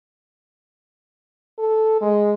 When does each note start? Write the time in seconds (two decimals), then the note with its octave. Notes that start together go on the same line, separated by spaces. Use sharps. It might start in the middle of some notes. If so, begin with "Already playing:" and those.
1.58 A4
2.01 G#3